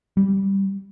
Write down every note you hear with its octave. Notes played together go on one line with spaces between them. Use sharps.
G3